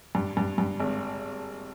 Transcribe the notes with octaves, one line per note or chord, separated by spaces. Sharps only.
G2
G2
G2
G#1